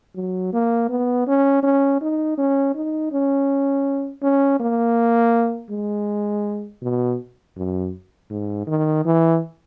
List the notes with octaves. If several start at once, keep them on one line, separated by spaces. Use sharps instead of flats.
F#3
A#3
B3
C#4
C#4
D#4
C#4
D#4
C#4
C#4
A#3
G#3
B2
F#2
G#2
D#3
E3